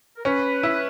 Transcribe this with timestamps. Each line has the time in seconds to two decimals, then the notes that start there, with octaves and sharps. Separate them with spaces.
0.16 A#4
0.25 C#4 B4
0.63 E4